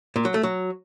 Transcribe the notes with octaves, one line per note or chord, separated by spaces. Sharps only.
A#2
F#3
A3
F#3